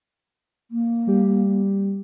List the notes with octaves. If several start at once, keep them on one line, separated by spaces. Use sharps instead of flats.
A#3
G3 G4